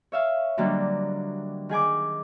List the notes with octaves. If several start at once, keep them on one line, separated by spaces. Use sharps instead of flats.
C#5 E5 F5
D3 F#3 G3 A#3 D#4
D#3 G#4 G#5 D6